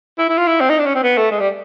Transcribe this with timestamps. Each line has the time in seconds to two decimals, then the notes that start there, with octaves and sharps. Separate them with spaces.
0.18 E4
0.29 E4
0.38 F4
0.47 E4
0.60 C4
0.69 D#4
0.78 D4
0.86 C#4
0.95 C4
1.03 B3
1.17 A3
1.31 G#3
1.40 G3